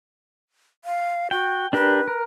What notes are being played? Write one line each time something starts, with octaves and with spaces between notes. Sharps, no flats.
F5
F#4 G5
D4 G4 A#4 B4
A#4